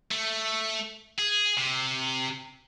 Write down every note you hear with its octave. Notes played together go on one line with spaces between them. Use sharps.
A3
G#4
C3